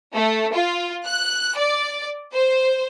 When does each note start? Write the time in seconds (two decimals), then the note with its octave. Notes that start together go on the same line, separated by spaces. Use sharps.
0.14 A3
0.53 F4
1.05 F#6
1.56 D5
2.33 C5